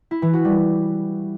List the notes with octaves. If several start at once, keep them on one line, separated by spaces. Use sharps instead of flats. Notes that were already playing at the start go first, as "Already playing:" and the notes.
E4
E3
F#4
G3